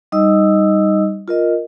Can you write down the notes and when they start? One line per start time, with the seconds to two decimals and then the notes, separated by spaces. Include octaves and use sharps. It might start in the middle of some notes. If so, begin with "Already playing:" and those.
0.12 G3 D#4 D#5 D#6 E6
1.28 F4 A#4 D#5